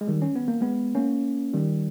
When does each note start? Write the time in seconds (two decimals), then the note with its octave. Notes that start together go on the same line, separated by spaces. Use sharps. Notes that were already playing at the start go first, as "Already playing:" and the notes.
0.01 G#3
0.08 D#3 G3
0.22 C#4
0.36 B3
0.48 A#3
0.61 G#3 B3
0.95 A#3 C#4
1.53 D#3 G3